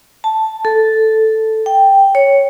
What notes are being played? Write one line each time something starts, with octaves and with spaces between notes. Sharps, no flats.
A5
A4
G5
C#5